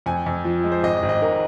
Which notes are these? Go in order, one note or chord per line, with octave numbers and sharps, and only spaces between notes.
F2 G#5
F2
F3
G#3
C5
G#1 D#5
D#5
G#1
D#5
G#2 A#4